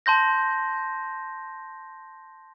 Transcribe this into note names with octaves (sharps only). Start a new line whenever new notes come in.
A5 C6 G6 A#6